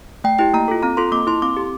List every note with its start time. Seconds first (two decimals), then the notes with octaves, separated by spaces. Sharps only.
0.24 A3 G5
0.38 E4 G4 G5
0.54 A#3 A#5
0.68 F4 A4
0.83 C4 A#5
0.97 F4 A4 C6
1.12 A#3 D6
1.27 E4 A4 C6
1.42 C4 D6
1.57 G4